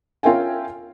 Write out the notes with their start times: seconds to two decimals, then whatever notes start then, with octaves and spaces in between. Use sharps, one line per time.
0.23 C#4 F4 A#4 E5 G5 G#5